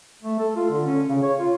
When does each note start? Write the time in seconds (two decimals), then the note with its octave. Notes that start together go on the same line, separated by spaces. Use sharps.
0.23 A3
0.39 A4
0.56 F4
0.70 D3
0.85 C#4
1.09 C#3
1.23 C#5
1.39 F4